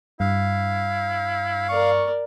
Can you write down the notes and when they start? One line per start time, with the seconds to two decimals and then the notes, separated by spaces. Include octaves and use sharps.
0.20 G2 E4 F5
1.69 A#4 D5 C#6